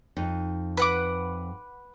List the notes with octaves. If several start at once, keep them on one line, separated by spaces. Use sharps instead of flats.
F2 D#4
B4 F#5 D6